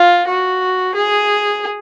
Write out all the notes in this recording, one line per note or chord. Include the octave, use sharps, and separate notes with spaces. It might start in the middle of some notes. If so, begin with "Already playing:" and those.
Already playing: F4
F#4
G#4